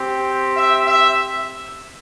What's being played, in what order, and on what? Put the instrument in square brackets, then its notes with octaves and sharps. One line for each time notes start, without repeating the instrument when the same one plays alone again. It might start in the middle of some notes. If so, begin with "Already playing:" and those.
Already playing: [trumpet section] C4 G4
E5
E5